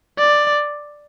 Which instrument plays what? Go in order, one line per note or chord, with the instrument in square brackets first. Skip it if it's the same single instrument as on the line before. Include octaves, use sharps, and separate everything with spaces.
[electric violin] D5